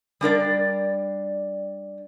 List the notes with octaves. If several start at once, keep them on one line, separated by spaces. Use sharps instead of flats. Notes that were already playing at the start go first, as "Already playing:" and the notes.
G3 D4 A#4 D5